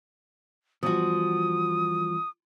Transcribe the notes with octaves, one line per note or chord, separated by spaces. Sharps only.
E2 G2 F3 F#4 D#6